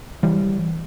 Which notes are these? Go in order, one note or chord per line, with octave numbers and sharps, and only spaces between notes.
E3 G3